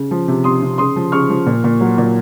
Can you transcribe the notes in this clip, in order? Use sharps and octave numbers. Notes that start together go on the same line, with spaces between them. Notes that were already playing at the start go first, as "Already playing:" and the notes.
Already playing: C#3
F3
C3
C3 C6 D#6
C3
C#3 C6 D#6
F3
C#3 C#6 F6
F3
A#2
A#2
F#3
A#2